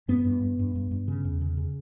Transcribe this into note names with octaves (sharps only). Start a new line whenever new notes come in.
G2 B3
G2
G2
G2
G2
G2
C#3
E2
C#3
C#3